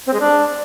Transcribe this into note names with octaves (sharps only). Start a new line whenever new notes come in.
C4
G#3
D4